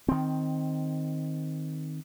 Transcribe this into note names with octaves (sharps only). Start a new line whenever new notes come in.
D#3 C4